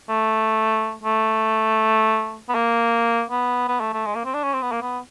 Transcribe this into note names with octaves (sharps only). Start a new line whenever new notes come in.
A3
A3
B3
A#3
B3
B3
A3
A3
G#3
A#3
C4
D4
C#4
C4
B3
A#3
B3